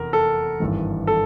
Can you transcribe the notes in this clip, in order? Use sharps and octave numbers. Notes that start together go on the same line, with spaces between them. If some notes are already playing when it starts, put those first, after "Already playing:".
Already playing: F1 E2 A#4
A4
G#1 G2 E3
A4